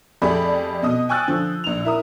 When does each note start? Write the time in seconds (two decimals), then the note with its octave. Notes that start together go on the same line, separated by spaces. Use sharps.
0.22 F2 A3 G4 G#4 D5 B5
0.82 B2 D#5 D#6
1.09 G5 G#5 C#6 E6 F#6 A6
1.28 D3 F3
1.64 A#1 F7
1.85 E4 A#4 D#6